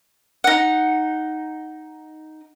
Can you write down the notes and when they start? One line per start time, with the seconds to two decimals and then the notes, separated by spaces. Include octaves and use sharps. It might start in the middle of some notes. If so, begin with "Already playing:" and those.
0.44 D#4 F#5